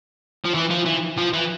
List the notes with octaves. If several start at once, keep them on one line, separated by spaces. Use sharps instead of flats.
F3
E3
F3
E3
F3
E3